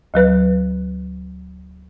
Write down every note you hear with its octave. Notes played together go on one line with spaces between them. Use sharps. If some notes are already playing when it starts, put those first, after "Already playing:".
D2 F#3 B4 F#6